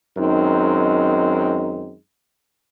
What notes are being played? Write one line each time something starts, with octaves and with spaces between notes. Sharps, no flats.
F#2 D#3 G#3 C4 D#4